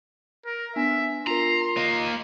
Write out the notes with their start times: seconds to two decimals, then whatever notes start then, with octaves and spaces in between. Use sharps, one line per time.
0.46 A#4
0.76 B3 D4 E5 G#5
1.27 F4 A#4 A#5 C6
1.77 A#3 D#5